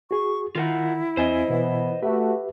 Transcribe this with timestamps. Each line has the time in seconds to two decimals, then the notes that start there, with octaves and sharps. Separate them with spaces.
0.11 F#4 G#4 C#6
0.55 D#3 E4 F4 A#4 F#5
1.17 E2 C4 C5 D#5 G#5
1.49 B2 E3 B3
2.02 A3 F#4 G4 B4 E5